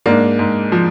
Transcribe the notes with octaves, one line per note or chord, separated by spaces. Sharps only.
G#2 A#3 D4
G#2
F3